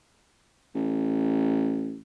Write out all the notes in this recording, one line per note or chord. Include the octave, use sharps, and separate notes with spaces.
A1